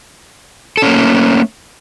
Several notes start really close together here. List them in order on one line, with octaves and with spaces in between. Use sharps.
A4 C#4 A#3 A3